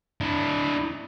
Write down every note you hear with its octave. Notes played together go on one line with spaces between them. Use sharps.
D4 E4